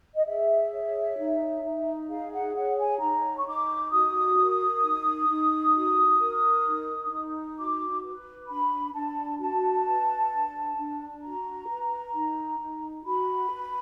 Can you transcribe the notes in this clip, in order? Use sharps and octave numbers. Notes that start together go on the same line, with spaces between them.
D#5
G#4 E5
C#5
D#4
D#4
G#4 F5
F#5
C#5 F#5
G#5
D#4 A#5
C#6
D#4 D6
F#4 D#6
A#4
D#4
D#4
F#4
A#4
D#4
D#4
F#4 D6
B4
D4 B5
D4 A5
F#4 A5
B4
D4
D4
F#4 A#5
B4
D#4
D#4
F#4 B5
B4